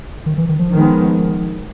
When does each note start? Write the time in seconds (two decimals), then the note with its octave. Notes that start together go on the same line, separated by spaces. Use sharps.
0.26 D#3
0.38 E3
0.49 D#3
0.59 F3
0.70 D#3 G#3 B3